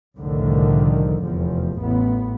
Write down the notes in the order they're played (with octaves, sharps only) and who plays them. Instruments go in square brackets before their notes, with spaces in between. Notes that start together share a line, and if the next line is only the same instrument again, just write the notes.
[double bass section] C2 F2 A2 D3 D#3
F1 E2 F3
A1 B3